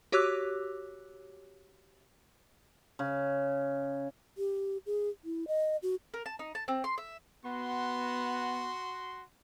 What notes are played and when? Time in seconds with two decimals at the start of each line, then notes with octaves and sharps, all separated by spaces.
0.12 F#4 G4 C#5 D6 E6 F#6
2.99 C#3
4.37 G4
4.86 G#4
5.24 E4
5.48 D#5
5.82 F#4
6.14 A#4
6.26 A5
6.39 D#4
6.55 A5
6.68 C4
6.84 C6
6.98 E5
7.45 B3 F#4 C6